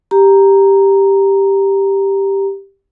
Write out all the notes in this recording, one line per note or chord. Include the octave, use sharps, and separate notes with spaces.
G4 A#5